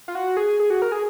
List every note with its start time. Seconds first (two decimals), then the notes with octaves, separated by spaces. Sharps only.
0.08 F4
0.15 F#4
0.37 G#4
0.59 G#4
0.70 F#4
0.82 A#4
0.92 G#4